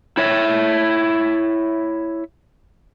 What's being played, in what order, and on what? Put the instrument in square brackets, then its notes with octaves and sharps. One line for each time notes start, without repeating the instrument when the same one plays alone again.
[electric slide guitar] E4 C#5 E5